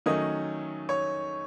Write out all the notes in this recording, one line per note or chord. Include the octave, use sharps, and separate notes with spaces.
D#3 F#3 A3 C#4 D#5
C#5